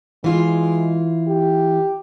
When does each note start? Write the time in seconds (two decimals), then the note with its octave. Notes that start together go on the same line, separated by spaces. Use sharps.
0.24 E3 G#3 F4
1.28 G4